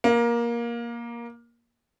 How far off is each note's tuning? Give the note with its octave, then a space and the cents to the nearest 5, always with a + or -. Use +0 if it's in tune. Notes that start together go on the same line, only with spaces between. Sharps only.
A#3 +15